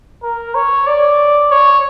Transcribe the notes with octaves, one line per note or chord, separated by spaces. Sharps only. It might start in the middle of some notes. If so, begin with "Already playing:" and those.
A#4
C#5
D5
C#5